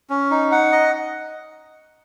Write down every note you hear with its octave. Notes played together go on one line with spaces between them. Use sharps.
C#4
D#4
F#5
D#5